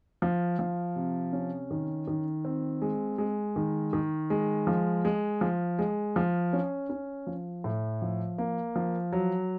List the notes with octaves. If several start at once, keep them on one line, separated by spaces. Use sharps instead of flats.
F3
F3
C3
C#4
D#3
D#3
C4
G#3
G#3
D#3
D#3
G#3
F3
G#3
F3
G#3
F3
C#4
C#4
F3
A2
F3
A#3
F3
F#3